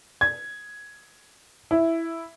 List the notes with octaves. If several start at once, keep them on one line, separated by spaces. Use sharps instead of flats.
G#6
E4